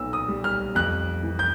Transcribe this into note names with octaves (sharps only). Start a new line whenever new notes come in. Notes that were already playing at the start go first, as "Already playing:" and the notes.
Already playing: B1 A#2 B3 E6
D#6
G3
F6
F2 F#6
E3
G6